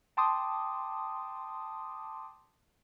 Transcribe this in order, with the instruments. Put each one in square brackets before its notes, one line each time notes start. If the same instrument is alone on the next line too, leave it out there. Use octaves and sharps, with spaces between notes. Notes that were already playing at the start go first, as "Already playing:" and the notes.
[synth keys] G5 A5 C6 D6 D#6